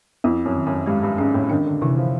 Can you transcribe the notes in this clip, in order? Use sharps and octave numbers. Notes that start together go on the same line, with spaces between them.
F2 E4
F#2
D#3
F#2
G2 G#3
G2
G#2 C#4
A2
D#3 D4
D3
C3 E3
F3